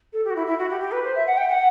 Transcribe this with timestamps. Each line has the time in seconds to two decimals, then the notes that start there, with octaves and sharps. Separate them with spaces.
0.13 A4
0.24 G4
0.30 F#4
0.35 E4
0.46 E4
0.58 F#4
0.70 G4
0.80 G4
0.91 B4
1.03 C5
1.15 E5
1.26 F#5
1.37 G5
1.48 F#5